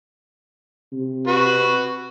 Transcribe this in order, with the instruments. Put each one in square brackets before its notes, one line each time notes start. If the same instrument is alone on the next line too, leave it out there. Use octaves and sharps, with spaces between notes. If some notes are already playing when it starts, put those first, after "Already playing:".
[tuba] C3
[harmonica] F#4 B4